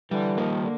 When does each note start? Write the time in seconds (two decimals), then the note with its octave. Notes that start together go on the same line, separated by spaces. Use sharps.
0.11 D3 E3 G3
0.37 D#3 F3 A#3
0.63 D3